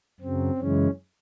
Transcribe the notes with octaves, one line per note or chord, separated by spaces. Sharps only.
F#2 C#3 F#3 C4
F#2 C#3 E3 G#3 C#4